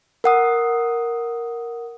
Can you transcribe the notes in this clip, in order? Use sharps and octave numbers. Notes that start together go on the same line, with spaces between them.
A#4 F#5 D#6